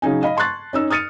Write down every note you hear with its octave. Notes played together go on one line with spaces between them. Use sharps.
C#3 F#3 D#4 G#5
D#5 F5 B5
A5 C6 C#6 F#6 A6
C#4 D#4 E6
D#6 F6 A6 C#7 D#7